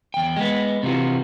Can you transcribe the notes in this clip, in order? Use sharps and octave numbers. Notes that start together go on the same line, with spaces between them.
E2 G5
G#3 B3
C3 E3 F4 F#4